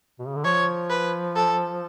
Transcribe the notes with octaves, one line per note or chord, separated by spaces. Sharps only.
B2
C#3
D3
F3 C#5
B4
A4